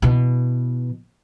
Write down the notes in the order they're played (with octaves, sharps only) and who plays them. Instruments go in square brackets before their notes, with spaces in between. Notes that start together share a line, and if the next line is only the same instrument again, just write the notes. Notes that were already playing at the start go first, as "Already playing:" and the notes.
[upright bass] B2 E3